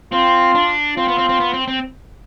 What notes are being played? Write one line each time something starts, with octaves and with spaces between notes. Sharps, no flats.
C4 F4
D4
C4 F4
B3
C4
C4
B3
C4
C4